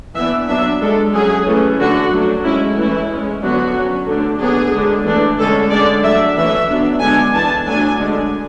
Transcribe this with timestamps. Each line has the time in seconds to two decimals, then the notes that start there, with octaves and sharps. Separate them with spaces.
0.16 E3 B3 D4 E5
0.49 F#3 B3 D4 E5
0.81 G#3 D4 A4
1.14 F#3 C#4 G#4
1.47 E3 A3 C#4
1.79 D3 A3 D4 F#4
2.12 F#3 A3 D4
2.44 G#3 C#4 E4
2.77 E3 A3 C#4 E4
3.10 G#3 C#4
3.42 D3 F#3 B3 D4 F#4
3.75 F#3 C#4
4.08 D3 A3 D4
4.41 D3 F#3 B3 D4 G#4
4.74 D3 G#3 D4
5.06 E3 A3 D4
5.38 D3 G#3 C#4 A4
5.71 D3 G#3 D4 D5
6.03 F#3 A3 D4 E5
6.36 E3 A3 C#4 E5
6.69 F#3 B3 D4
7.01 D3 G#3 B3 D4 G#5
7.34 E3 B3 D4 A5
7.67 F#3 A3 D4 G#5
7.99 D3 G#3 D4